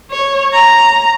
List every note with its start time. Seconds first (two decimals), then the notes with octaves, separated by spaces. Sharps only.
0.11 C#5
0.53 A#5